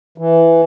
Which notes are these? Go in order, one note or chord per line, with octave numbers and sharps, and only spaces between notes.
E3